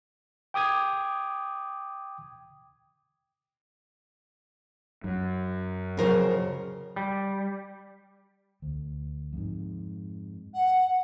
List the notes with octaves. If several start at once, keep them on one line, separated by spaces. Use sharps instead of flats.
G5 D6 D#6 G#6
F#2
F2 C#3 F#3 A#4 C5
G3
D2
F2 G#2
F#5